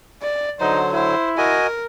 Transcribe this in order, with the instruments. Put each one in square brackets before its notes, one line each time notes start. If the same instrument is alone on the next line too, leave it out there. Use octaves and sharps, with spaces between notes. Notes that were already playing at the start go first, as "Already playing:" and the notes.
[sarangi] D5
[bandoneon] D3 F#3 [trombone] D#4 [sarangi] C5
[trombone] E4 [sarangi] C5
[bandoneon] F#4 D#5 G#5 [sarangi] A#4